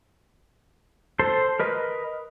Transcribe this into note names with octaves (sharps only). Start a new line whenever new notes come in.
A4 C5 C6
A#4 B4 D#5